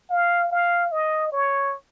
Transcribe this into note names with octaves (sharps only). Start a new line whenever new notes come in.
F5
F5
D#5
C#5